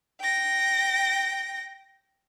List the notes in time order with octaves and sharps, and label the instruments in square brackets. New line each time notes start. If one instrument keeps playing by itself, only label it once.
[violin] G5 A#6